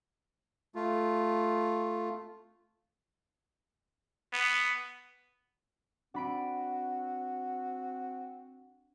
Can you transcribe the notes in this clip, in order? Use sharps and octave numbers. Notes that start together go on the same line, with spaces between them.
A3 F4
B3
C4 D4 F#4 B5 D7